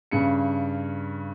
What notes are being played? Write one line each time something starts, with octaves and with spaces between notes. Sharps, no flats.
G2 C#3 C#7